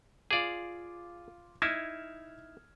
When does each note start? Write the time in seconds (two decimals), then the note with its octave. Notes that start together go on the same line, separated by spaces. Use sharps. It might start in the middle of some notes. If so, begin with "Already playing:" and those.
0.31 F4 G#4 D5 F5 D6
1.62 D#4 E4 F6 G#6 E7